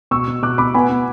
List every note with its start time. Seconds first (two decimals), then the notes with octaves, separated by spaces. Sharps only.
0.11 B2 C#6 E6
0.28 B2
0.42 B2 D6 F#6
0.58 B2 B5 D6
0.74 B3 G#5 B5
0.90 B3